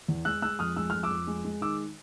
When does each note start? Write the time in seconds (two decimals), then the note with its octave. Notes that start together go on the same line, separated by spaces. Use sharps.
0.08 E2
0.25 G#3 E6 F#6
0.42 G#3 E6 F#6
0.59 F2 D#6 F6
0.76 G#3 E6
0.90 F2 F6
1.03 D6 E6
1.10 F2
1.27 G#3
1.45 G#3
1.61 D#3 D6 E6